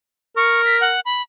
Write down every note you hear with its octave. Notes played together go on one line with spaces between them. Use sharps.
A#4 C#6
B6
F#5
B5